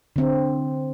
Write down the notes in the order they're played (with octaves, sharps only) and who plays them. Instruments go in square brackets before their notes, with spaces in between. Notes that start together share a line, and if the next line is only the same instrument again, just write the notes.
[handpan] D3 C4